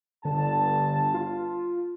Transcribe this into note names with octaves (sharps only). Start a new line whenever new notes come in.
G1 G2 D3 A5
F4